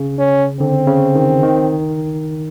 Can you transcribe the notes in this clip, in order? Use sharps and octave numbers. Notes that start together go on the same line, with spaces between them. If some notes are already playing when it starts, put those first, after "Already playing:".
Already playing: C#3
C#4
D3 C4
C#3
D#3
D#3